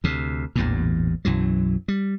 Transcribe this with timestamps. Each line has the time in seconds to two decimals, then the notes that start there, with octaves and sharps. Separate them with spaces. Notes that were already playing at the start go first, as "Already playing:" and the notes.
0.04 D2 C3
0.55 A1 E2 G2 A#2
1.25 B1 F#2 E3 F#3
1.88 G3